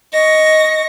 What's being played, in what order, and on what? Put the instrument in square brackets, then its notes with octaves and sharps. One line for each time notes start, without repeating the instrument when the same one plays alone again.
[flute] D#5 [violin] C#6 A#6